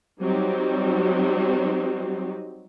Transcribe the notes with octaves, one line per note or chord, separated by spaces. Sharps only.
F#3 G3 C4 D#4 F#4 G4